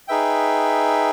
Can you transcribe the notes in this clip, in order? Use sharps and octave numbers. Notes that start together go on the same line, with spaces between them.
D#4 G#4 B4 E5 G5